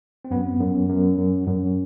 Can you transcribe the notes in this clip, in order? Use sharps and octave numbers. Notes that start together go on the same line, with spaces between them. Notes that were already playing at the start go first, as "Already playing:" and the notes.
C4
F#2 B3
F#2
F#2
F#2
F#2